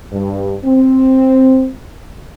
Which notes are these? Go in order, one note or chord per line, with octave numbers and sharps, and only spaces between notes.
G2
C4